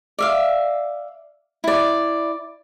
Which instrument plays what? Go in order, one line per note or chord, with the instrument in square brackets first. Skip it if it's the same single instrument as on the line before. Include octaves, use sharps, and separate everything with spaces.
[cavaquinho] D5 E5 F5
E4 D5